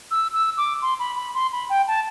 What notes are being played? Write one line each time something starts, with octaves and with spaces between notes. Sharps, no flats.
E6
E6
D6
C6
B5
B5
C6
B5
G5
A5